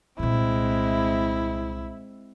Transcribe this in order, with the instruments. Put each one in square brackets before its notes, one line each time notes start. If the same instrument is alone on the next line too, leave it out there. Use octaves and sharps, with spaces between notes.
[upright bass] C2 A#2 [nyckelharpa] G#3 C4 [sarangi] E4